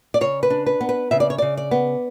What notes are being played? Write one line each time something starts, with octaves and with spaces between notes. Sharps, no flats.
D5
C#3 C#5
B4
D4
B4
B3
B4
C#3 E5
D5
C#5
C#3 D5
D5
B3